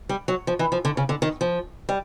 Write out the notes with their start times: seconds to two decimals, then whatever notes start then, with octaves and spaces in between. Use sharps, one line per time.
0.09 G3
0.28 F#3
0.47 F3
0.59 E3
0.72 F3
0.85 D3
0.97 C#3
1.09 D3
1.22 D#3
1.41 F3
1.89 G3